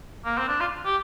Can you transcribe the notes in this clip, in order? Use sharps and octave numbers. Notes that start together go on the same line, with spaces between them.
A#3
C4
D4
F4
G4